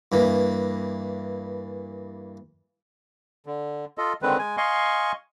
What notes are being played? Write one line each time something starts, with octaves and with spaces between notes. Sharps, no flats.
G2 E3 A#3
D3
F4 A4 D#5
D3 D#3 G#3 C4 B4
G#3 G#5
D#5 F5 G#5 C6 C#6